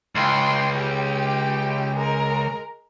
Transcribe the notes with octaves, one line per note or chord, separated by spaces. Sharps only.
C#2 G5 C6
G4 G5
G#3 A#4